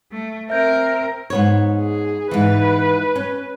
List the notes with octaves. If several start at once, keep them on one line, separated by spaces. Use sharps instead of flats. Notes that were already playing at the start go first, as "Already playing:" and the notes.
A3
C4 A#4 E5 G6 D7
G#2 B3 C#5
G#4
G#2 E3 B4
C#4